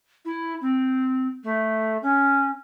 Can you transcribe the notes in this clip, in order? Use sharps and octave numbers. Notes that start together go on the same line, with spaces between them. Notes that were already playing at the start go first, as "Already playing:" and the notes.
E4
C4
A3
C#4